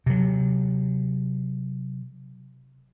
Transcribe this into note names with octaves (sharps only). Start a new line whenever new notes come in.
C3 F#3